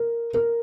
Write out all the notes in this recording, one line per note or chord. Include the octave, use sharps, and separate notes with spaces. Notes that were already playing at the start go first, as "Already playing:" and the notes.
Already playing: A#4
A#4